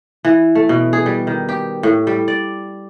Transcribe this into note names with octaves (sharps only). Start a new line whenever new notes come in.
E3
A3
B2
G#4
G3
D#3
G4
A2
G3
D5